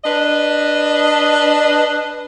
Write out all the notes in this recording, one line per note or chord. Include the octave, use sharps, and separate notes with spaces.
D4 B4 D#5